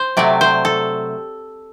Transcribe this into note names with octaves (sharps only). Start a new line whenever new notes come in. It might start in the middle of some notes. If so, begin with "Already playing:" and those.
Already playing: C5
C3 F#3 A3 D5
C5
A4